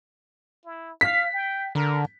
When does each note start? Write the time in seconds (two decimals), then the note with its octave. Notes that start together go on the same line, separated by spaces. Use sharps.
0.65 E4
1.01 F5 B6
1.34 G5
1.75 D3 A#4